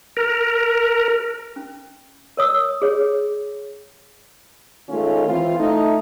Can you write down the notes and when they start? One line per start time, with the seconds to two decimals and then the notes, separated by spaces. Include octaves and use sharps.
0.17 A#4
1.56 C#4
2.37 A#4 C#5 D#6 E6
2.82 G#4 C#5
4.89 D#3 G#3 A3 C#4 F4
5.27 E3 C4 E4 F4
5.58 A3 D#4